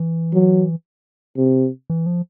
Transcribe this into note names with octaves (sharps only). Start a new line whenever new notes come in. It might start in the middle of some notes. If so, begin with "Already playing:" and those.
Already playing: E3
F#3
C3
E3
F3